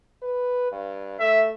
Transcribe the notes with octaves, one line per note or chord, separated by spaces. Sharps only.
B4
G2
A3 E5